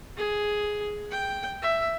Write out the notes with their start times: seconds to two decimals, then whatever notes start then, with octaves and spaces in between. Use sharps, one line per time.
0.17 G#4
1.11 G5
1.62 E5